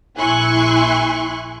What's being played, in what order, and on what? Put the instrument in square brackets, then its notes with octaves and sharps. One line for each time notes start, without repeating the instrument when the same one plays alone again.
[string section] A#1 E4 G#5 C6 C#6 F#6